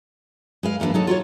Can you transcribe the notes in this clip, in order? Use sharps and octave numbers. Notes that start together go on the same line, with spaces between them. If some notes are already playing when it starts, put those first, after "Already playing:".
G#3 B4 F5
E3 A#3 B3 D4 B4
F#3 D#4 A4
F4 F#4 A4 C#5